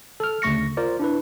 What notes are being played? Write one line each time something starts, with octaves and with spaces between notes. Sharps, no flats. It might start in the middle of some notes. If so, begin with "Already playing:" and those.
A4 F6
D2 C#3 A3 C#6 A#6 C#7
F4 A#4 C5 D5
D4 E4 B4